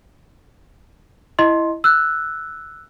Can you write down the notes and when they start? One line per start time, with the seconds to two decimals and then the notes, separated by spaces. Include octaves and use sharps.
1.39 E4 D#5 C6
1.84 E6 F#6